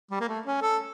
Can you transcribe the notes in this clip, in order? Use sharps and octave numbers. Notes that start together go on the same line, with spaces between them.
G3
A#3
A3
C#4
A4